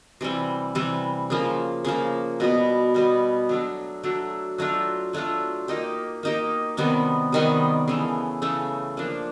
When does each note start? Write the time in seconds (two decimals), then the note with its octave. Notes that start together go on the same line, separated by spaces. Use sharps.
0.21 C3 E3 G3
0.75 C3 E3 G3
1.30 C#3 F3 A#3
1.85 C#3 F3 A#3
2.40 B2 G3 B3
2.94 B2 G3 B3
3.49 F#3 A3 D4
4.03 F#3 A3 D4
4.58 F#3 A3 D4 F4
5.13 F#3 A3 D4 F4
5.68 A#3 D#4 G4
6.23 A#3 D#4 G4
6.77 C3 D#3 G3 B3
7.32 C3 D#3 G3 B3
7.88 C#3 E3 A3
8.42 C#3 E3 A3
8.97 F3 A#3 D4